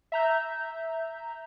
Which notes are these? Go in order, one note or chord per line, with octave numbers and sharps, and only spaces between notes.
E5 A#5 G6